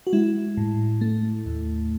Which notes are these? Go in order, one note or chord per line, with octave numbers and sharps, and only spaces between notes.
F#4
G#3 E4
A2
A3
D#2